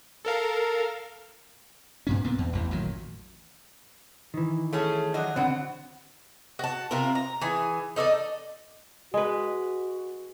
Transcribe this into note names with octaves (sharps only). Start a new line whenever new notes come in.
A4 A#4 F5
G2 A#2 C#4
D2 A#2 B3 C4
E2
A1 E2 A2
A1 A#2 D#3 F#3
D#3 E3
A3 C#4 G#4
D3 F#3 D#5
D3 F#3 B3 C4 F#5
F#4 A5
C3 C4 F4 A#4
A#5
E3 G#4 G#5
D#4 A4 C#5 D5
G#3 F#4 B4